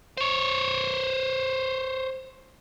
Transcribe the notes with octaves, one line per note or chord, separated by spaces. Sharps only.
C5 C#5